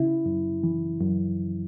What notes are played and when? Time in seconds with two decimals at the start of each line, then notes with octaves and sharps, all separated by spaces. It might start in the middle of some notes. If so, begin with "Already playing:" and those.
Already playing: C#3 E4
0.26 F#2
0.64 E3
1.01 F#2